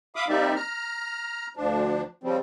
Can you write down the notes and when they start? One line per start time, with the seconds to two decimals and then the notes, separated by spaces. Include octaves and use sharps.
0.16 E5 F5 B5 D6 D#6
0.29 G3 A#3 C4 D#4 D5 E5
0.55 A#5 F6
1.57 D2 F3 D4
2.24 C#3 F3 G3 C4